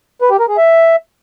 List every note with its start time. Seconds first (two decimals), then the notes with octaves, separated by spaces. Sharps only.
0.22 B4
0.30 G4
0.39 A#4
0.48 G#4
0.57 E5